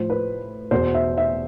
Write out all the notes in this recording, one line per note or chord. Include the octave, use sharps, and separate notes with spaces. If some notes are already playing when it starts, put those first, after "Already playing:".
Already playing: A2 F3 C5
B4
E2 B2 C5
E5
E5